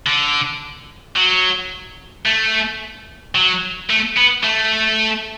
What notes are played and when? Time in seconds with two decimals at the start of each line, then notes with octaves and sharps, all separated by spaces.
0.07 D3
1.16 F#3
2.25 A3
3.35 F#3
3.90 A3
4.17 B3
4.44 A3